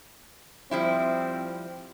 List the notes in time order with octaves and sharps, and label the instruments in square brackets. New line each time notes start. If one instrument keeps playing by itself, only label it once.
[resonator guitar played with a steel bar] F3 G3 E4 [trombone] C4